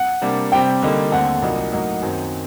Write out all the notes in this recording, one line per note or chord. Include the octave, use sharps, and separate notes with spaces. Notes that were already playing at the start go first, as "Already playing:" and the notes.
Already playing: F#5
C3 G3 A#3 D4
C3 G3 C4 G5
D3 G3 A#3 D#4
D#2 D3 A3 C4 F#5
C2 A#2 F#3 A#3 D#4
A2 F#3 A#3 D#4 F#4
F#2 D#3 F#3 C4